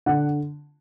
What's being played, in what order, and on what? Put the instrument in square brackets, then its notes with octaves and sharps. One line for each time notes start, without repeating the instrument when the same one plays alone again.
[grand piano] D3 F#5